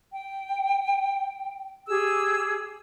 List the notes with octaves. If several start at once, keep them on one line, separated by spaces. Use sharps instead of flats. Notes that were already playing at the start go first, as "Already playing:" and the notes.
G5
G4 G#4 E6